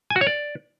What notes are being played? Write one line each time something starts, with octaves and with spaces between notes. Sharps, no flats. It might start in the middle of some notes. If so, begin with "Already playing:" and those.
G#5
F#4
C#5
D5